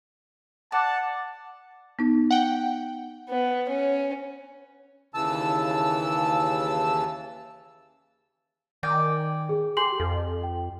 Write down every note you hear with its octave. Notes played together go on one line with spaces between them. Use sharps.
D5 F#5 A5
B3 D#4
F#5 G5
B3
C#4
D#2 C#3 E3 A5 E6
D#3 D5 G5 G#5
G#4
G4 A4 G#5 C6 F#7
F2 A4
G5